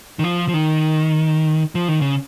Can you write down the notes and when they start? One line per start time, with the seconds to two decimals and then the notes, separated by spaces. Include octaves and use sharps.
0.19 D#3
0.24 F3
0.48 F3
0.54 D#3
1.75 F3
1.88 D#3
2.01 C#3